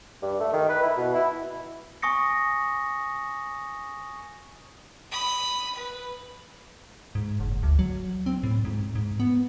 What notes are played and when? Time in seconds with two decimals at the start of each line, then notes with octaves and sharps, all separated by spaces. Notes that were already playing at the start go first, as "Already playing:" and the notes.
0.22 G2
0.40 A3
0.53 D#3
0.69 B4
0.82 E4
0.97 B2
1.14 E4
2.02 G#5 C#6 D#6 A#6 C#7
5.11 B5 D#6
5.74 B4
7.15 G#2
7.40 F#1
7.63 D2
7.79 F#3
8.26 C4
8.43 A2
8.65 G#2
8.95 G#2
9.20 B3